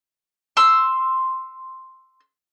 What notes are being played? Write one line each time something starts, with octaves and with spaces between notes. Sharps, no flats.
C6 E6